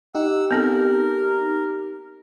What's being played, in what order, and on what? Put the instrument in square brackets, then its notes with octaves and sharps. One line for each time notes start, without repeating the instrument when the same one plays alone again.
[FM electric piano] D#4 G4 [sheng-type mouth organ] F#5 E6
[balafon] B3 C4 A4 [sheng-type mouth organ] A#4